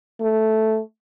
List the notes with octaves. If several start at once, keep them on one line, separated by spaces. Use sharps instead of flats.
A3